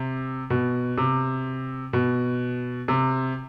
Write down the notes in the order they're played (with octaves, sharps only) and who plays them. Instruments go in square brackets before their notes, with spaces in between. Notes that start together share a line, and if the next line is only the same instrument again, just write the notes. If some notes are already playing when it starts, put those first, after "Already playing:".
Already playing: [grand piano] C3
B2
C3
B2
C3